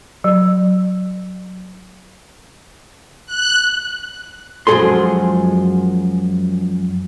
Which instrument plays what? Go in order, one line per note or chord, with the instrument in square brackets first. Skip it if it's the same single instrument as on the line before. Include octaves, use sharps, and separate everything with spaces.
[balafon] F#3
[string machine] F#6
[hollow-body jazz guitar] F#2 F3 G#3 G#4 A4 C6